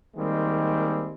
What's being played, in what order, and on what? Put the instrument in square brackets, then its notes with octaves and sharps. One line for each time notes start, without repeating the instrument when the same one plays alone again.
[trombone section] D#3 G3 G#3 A#3 C4